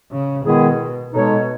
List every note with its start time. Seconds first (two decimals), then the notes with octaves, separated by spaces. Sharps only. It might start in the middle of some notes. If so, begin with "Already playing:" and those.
0.12 C#3
0.45 B2 D#3 G#3 B3 E4 G#4
1.13 B2 G#3 D#4 A4 C#5